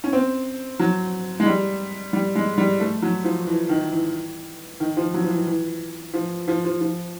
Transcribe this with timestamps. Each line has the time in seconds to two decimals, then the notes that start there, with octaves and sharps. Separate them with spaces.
0.04 C#4
0.13 C4
0.79 F#3
1.40 G#3
1.46 G3
2.13 G3
2.35 G#3
2.58 G3
2.80 A3
3.02 F#3
3.25 F3
3.47 E3
3.69 D#3
3.92 E3
4.80 D#3
4.97 F3
5.14 F#3
5.23 F3
5.30 E3
5.47 E3
6.14 F3
6.48 F3
6.65 F3
6.81 F3